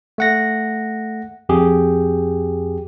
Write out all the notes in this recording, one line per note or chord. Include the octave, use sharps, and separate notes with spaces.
A3 F#5 A#6
F2 G4 G#4